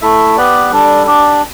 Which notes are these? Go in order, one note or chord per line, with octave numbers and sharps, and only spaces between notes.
A3 E4 A4 E5
B3 G4 B4 D5
G3 D4 A4 D5
D4 G4 D5